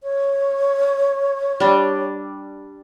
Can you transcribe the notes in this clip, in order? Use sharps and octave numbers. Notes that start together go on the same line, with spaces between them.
C#5
G3 D4